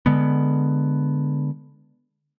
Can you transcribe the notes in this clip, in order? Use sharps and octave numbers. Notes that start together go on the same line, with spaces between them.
D3 G#3 B3